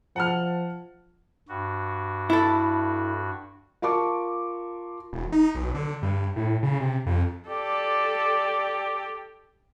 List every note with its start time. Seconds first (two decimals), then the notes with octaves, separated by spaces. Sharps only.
0.16 F3 F#5 A5 F6
1.48 G2 F#4
2.30 E4 A4
3.82 F4 A#4 A5 C#6 D6
5.13 E1
5.32 D#4
5.55 B1
5.75 D3
6.03 G2
6.36 A2
6.63 C#3
6.80 C3
7.06 F2
7.48 G4 A4 D5